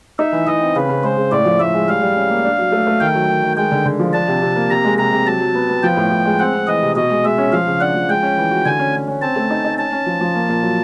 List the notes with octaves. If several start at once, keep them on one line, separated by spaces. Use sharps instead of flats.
D#4 E5
E3
E3 D#5
C4
C#3 B4
C#3
G#3 C5
C#3
A2 D5
F3
A2 E5
G#3
G3 F5
G3
C#4
A#3
D4
F#3
A3
A3
D#3 G5
F#3
D#3
D#3
G#3 G5
D3
D3
F3
D4 A5
C3
C3
A#3
C3 A#5
G#3
C3 A#5
C3
F#3 A5
F#3
B3
B3
F3 G5
A2
A2
G#3
C4 F#5
C4
E3 D#5
C3
B2 D#5
G#3
G#3 E5
C#4
F3 F5
C#3
D4 F#5
F3
G#3 G5
C#4
E3
F#4
D3 G#5
C#4
C#4
C#4
C4 A5
A3
D#4
D#4
C#4 A5
C#4
F3
F3
A#3
A#2
F#3